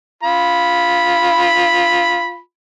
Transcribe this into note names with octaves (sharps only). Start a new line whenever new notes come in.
F4 B5